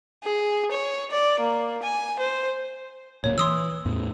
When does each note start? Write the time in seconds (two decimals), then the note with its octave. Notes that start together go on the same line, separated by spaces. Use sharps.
0.24 G#4
0.71 C#5
1.11 D5
1.40 A#3
1.83 G#5
2.19 C5
3.24 D1 A#2 A#3 C#5
3.38 E3 C6 D#6 E6
3.85 E2 A2